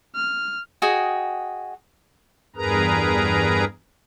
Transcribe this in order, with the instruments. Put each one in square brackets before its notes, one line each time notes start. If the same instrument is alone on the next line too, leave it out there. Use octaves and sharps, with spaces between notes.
[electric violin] F6
[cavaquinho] F#4 G#4 D#5 G5
[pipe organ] E2 G2 G#4 A#4 B4 A#5